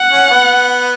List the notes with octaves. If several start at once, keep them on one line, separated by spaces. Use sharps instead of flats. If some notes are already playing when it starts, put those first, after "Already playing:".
Already playing: F#5
C#4
B3